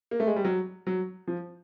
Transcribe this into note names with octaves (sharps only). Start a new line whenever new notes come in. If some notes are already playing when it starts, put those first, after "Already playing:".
A#3
A3
G#3
G3
F#3
F#3
F3